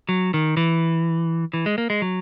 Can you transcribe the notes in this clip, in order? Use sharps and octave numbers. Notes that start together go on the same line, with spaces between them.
F#3
D#3
E3
E3
G#3
A#3
G#3
F#3